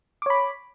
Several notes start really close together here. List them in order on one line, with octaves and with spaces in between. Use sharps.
D6 C#5 B5